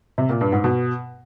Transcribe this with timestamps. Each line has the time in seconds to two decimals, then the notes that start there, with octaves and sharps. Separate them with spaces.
0.18 C3
0.29 A#2
0.41 G2
0.52 G#2
0.64 B2